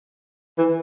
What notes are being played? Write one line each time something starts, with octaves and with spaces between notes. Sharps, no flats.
E3